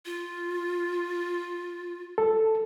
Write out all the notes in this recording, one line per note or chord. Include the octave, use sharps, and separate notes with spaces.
F4
A4